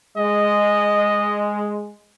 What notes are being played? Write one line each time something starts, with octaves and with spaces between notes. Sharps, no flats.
G#3 D#5